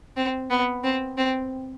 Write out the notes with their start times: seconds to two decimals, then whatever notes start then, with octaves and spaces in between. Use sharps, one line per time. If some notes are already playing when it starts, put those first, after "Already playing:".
0.17 C4
0.50 B3
0.84 C4
1.18 C4